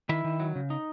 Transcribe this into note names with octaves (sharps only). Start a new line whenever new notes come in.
D#3 E4 E5
D#3
F#3
C#3
D#4